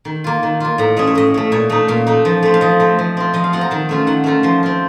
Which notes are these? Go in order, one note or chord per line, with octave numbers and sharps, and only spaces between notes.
D#3
A#3 F4
D#3
A#3 F4
A2 A#5
A3 C#4 D#5
C#5
A2 D#5
A3 C#4
A#2 C#5
A3 D#4 D#5
A#2 F5
A3 D#4
F3
A3 C4
F5
F3 D#5
A3 C4
F3
C4 F4
F3 D#5
F5
C4 F4 F#5
A#5
D#3 A5
A3 C#4 F4
D#3 F#5
A3 C#4 F4 A#5
F3 C6
C4 F4